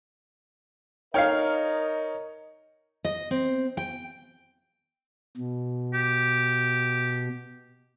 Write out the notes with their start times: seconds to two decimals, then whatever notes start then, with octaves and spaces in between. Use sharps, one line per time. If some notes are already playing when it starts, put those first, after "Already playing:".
1.14 D#4 A#4 C#5 D#5 F5 G5 F6
3.05 D#5
3.31 C4
3.77 G5
5.37 B2
5.94 G4